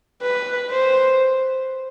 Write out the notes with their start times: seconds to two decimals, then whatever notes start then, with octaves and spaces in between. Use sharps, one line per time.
0.23 B4
0.71 C5